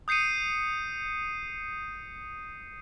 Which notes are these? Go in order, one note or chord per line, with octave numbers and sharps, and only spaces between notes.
D#6 G6 C7 C#7 D#7